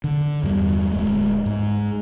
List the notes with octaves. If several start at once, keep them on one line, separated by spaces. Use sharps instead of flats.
D3
E2 G2 G3
D1 G#3
G#2